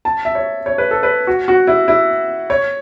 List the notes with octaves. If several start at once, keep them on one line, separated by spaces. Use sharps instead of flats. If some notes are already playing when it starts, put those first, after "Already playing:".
A5
E5
C#5
C#5
B4
A4
B4
F#4
F#4
E4
E4
C#5